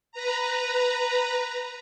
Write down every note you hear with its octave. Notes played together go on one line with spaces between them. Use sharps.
B4 A#5